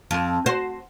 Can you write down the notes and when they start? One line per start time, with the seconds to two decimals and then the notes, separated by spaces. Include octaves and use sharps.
0.11 F2
0.46 F#4 C5